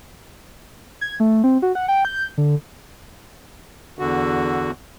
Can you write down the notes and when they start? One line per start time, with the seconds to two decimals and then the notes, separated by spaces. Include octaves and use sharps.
1.01 G#6
1.20 A3
1.44 C4
1.62 F#4
1.75 F#5
1.88 G5
2.05 G6
2.38 D3
3.99 E2 D3 F#4